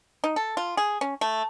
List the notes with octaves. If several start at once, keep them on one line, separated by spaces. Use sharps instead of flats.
D#4
A4
F4
G#4
C#4
A3